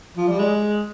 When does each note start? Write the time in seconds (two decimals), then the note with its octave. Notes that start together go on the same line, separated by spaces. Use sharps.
0.17 F3
0.28 G3
0.39 G#3